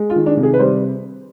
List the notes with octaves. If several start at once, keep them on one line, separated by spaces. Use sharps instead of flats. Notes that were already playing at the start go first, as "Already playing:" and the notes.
Already playing: G#3
F4
D#3
D4
C3
G#4
B4
G3 C5